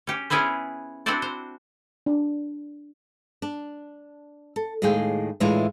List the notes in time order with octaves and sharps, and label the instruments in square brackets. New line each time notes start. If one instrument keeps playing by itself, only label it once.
[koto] C#4 G4
B3 C#4 E4 G#4 B4 C5
C4 D4 E4 F#4 C5 D5
C5
[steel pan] D4
[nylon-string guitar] D4
A4
D#2 A2 G#3 G#4 F5 G5
A2 E3 G#3 D4 E4 F4